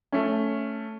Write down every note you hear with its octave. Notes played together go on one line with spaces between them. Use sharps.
A3 C#4